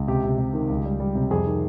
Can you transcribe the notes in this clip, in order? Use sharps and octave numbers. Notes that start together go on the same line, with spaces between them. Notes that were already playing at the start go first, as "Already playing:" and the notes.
Already playing: C#2
C3 G4
C3
C3
D#3
C#2
G3
G3
C3
F2 G#4
D#3